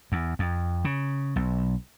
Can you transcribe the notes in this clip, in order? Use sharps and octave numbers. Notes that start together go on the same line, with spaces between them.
E2
F2
C#3
B1